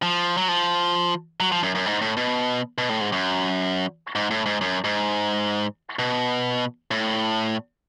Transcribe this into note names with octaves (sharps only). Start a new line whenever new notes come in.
F3
F#3
F3
F#3
F3
F#2
F#2
G#2
A2
B2
B2
A2
G#2
F#2
G#2
A2
G#2
F#2
G#2
B2
A2